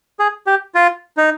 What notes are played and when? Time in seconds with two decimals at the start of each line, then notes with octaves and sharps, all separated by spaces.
0.19 G#4
0.47 G4
0.75 F4
1.17 D#4